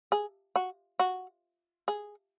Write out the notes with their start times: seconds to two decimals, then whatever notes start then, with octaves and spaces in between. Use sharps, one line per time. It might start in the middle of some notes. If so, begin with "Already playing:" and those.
0.12 G#4
0.56 F#4
0.99 F#4
1.88 G#4